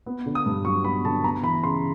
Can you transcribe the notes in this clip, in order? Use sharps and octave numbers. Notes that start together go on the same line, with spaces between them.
B3
D3
D#6
G2
F#3 C#6
B3 B5
D3 A5
B3 A#5
E3 B5
C#3 C6